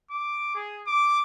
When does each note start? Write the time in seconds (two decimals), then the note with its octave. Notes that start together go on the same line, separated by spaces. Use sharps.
0.10 D6
0.55 G#4
0.87 D6